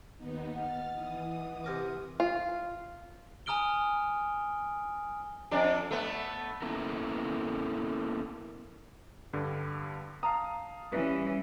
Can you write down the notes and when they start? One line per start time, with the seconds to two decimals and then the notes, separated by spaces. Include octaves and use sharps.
0.17 D#2 B3 D#4
0.55 D#5 F#5 F6 A6
0.94 E3 D#6
1.64 C3 A#4 D6
2.20 F4
3.46 G#5 A#5 D#6 F6 D7 G7
5.51 F2 D4 D5
5.91 A3 B3
6.62 A#3 B3 C#4 E4 A4 A#4
9.33 G2 D3 G3
10.23 F5 A5 A#5 D#6
10.92 E3 G3 C#4 F#4 B4 D5